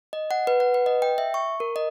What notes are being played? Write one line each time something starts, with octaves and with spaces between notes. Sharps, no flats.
D#5
F#5
B4
F#5
B4
D#5
G5
E5
C#6
A#4
D#5